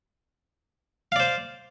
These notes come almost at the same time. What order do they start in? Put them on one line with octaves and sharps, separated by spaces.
F5 D5 C5